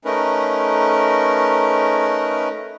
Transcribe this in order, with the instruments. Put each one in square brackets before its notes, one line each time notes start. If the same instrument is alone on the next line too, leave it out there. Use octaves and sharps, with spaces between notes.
[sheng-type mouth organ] A3 C#4 D#4 A#4 B4